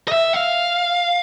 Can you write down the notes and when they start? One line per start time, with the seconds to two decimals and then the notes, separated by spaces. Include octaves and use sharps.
0.08 D#5
0.12 E5
0.33 F5